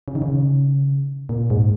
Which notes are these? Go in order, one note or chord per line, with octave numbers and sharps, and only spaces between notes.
C#3
D#3
C#3
A#2
G#2